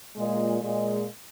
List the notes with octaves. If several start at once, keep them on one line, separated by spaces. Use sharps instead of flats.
A#2 G#3
A#2 G#3